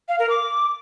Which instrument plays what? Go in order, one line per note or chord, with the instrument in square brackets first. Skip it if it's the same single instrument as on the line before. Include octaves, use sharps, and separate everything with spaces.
[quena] F5
A#4
D6